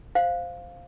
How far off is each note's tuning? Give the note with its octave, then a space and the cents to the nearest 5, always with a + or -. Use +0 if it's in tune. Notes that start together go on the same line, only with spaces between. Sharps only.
C5 -5 F5 +0